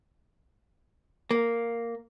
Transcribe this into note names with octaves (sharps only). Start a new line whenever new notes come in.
A#3